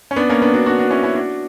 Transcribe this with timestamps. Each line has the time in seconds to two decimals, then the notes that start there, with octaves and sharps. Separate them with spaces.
0.11 C#4
0.16 B3 D4
0.30 A#3 C#4
0.42 B3 D4
0.54 D4 F#4
0.66 D4 F#4
0.79 D4 F#4
0.91 C#4 E4
1.03 C#4 E4
1.15 D4 F#4